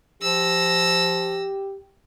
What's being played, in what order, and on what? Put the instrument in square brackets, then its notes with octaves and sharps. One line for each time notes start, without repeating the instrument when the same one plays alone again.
[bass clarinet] F3 [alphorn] G4 [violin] E6 A#6